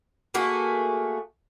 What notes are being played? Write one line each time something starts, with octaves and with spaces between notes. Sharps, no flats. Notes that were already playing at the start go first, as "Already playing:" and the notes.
A3 A#3 F#4 G#4